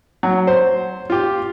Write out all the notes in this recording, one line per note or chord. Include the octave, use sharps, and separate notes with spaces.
F#3
C5
F4 G4